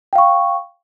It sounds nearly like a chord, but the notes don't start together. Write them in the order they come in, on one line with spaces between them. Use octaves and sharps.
G5 F5 C#6